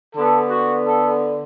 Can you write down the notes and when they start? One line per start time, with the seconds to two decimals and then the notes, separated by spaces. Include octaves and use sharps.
0.16 D3 B3 D4 A4
0.50 F#4
0.86 A4